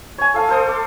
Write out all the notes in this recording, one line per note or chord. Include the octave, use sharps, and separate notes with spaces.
C#5 G#5
A4 F5 A5
A4 C5 D#6
D6